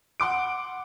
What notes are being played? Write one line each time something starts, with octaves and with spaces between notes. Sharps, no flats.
F#5 C6 D6 D7